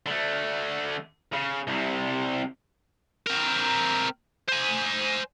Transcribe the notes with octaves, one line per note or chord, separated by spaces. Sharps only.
D3 A3
C#3
C2 C3
C4 A#4
C5 G#5